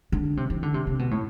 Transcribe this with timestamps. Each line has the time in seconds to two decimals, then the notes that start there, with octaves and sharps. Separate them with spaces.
0.12 D3
0.37 C3
0.50 E3
0.63 D3
0.74 C3
0.87 C3
0.99 B2
1.11 A2